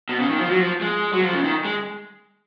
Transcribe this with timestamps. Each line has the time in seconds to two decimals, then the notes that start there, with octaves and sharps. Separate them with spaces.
0.09 B2
0.20 C#3
0.29 D#3
0.39 F3
0.50 F#3
0.61 F3
0.81 G#3
1.13 F#3
1.23 F3
1.33 C#3
1.44 D#3
1.65 G#3